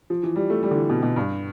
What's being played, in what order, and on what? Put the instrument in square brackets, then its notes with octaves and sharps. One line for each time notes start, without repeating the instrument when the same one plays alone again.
[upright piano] F3
E3
G3
A3
G3
D3
E3
B2
B2
G2